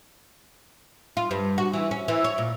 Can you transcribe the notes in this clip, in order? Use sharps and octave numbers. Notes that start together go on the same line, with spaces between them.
F4
G2
F#4
E3
C#4
E3
C#5
A#2